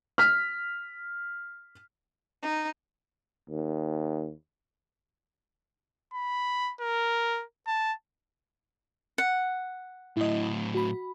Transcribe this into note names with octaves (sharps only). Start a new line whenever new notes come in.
F6 B6
D#4
D#2
B5
A#4
A5
F#5
A2 F#3 E4 D#5
F#4 B5